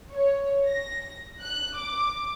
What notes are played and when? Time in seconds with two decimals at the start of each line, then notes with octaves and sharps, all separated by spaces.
0.11 C#5
0.68 A#6
1.41 F#6
1.76 D6